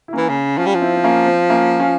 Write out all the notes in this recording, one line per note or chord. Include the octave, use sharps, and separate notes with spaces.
E4
E3 A#3 C#4
C#3
F3 C#4 F4
G3
F3
C4 E4
C4
A#3 C#4
C4
A#3 C#4
C#4 F4